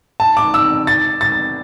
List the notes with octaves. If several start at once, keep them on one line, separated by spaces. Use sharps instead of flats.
A5
D6
E6
A6
A6